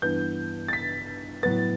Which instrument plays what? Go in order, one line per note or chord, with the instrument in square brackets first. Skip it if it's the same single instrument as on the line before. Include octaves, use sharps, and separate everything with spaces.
[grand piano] G2 E3 B3 G6
A6
B6
A2 F#3 B3 A6